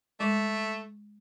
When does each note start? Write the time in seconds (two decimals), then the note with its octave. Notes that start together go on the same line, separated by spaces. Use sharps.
0.20 G#3 A3